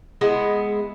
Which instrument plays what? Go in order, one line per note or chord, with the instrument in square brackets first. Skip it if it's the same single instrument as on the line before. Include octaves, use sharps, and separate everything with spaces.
[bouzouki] G#3 B3 E4 F#5